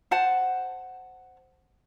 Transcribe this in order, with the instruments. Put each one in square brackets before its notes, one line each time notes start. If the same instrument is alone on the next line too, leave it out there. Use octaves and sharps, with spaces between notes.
[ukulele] C5 F#5 A5